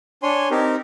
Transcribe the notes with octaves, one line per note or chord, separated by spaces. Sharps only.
D4 C#5 G#5 C6
C4 D#4 G4 A#4